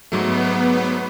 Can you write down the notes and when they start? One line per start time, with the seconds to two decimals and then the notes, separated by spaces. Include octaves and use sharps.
0.12 G#2 F#3 A3 B3